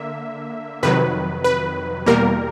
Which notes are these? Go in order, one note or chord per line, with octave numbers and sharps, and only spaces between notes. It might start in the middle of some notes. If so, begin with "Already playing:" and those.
Already playing: D3 A#3 E5
F2 C3 D#3 F#3 B4
B4
E2 B2 G3 A#3 A#4